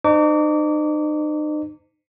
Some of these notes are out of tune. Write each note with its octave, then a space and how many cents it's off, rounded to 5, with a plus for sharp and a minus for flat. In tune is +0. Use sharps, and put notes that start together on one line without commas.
D#4 -40 C5 -30 D6 -30